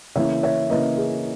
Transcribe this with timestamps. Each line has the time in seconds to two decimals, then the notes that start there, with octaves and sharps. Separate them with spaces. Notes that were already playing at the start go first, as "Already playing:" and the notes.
0.15 C#3 E3 A#3 C#5 E5
0.43 C#5 E5
0.70 C#3 E3 A#3 B4 D#5
0.97 G#4 B4